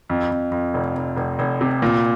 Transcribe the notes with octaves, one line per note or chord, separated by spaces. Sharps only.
F2
F2
F2
F1
F1
F1
F1
C3
A#2